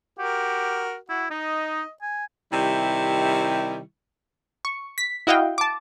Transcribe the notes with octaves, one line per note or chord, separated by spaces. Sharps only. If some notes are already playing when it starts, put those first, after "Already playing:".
F#4 G4 A#4
E4 F#4
D#4 D#5
G#5
C3 D#3 G3 E4
C#6
B6
E4 F#4 D#5 F5 G5
A5 D6